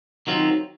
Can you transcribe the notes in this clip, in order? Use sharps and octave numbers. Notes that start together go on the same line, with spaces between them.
D#3 F#3 C4 F4